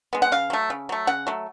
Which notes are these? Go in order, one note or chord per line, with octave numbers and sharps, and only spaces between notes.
G#3 B3
F#5
C#3 F5
F#3 A3
C#3
F#3 A3
C#3 F#5
F#3 A3